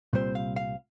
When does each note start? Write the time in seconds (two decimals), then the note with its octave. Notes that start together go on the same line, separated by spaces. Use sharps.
0.13 C2 A#2 G3 C4 C5
0.35 F5
0.56 F5